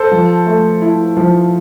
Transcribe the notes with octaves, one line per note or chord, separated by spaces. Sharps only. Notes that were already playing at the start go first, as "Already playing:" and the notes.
Already playing: A4 C5
F3
A3
E4
F3